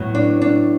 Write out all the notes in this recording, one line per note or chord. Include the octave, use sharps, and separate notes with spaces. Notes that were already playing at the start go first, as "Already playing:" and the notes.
Already playing: A2 F#3 B3
D4
D4